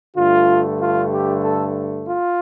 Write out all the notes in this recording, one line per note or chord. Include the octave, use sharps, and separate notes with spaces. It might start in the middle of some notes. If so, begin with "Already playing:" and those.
G2 D3 A3 F4
F4
G4
A4
F4